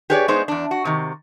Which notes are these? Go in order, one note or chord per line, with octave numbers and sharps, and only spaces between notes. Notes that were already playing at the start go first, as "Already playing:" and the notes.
G4 G#4 B4 C#5 D5
G#3 B3 D#4 G#4 C5
E2 D4
F#4
C3 D#3